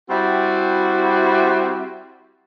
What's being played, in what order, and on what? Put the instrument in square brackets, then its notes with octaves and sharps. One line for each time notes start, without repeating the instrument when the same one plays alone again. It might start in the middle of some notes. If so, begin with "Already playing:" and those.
[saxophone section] G3 C4 E4 F#4